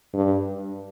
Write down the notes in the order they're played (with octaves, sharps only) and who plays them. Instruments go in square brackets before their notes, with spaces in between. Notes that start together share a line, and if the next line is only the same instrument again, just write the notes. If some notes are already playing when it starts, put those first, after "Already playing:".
[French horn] G2